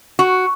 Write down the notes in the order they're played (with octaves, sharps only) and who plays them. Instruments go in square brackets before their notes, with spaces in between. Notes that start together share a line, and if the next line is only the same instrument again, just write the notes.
[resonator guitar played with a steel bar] F#4